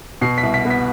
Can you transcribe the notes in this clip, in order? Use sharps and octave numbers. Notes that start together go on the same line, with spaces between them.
B2 C7
B6
C2
B6
B3
B6